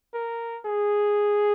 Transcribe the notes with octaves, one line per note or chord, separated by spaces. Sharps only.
A#4
G#4